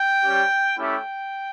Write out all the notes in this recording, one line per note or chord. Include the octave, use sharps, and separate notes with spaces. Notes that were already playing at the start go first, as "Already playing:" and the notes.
Already playing: G5
G3 C#4 G4
A3 C#4 E4 G4 G5